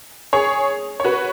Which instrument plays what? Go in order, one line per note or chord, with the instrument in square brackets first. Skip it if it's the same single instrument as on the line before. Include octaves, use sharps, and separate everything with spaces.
[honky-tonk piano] G#4 C#5
C#5
F#4 B4